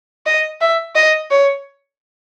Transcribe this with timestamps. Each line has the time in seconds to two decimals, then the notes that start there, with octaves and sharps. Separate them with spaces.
0.26 D#5
0.61 E5
0.95 D#5
1.31 C#5